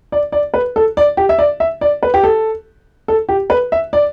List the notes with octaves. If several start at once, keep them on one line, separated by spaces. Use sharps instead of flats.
D5
D5
B4
A4
D5
G4
E5
D5
E5
D5
B4
G4
A4
A4
G4
B4
E5
D5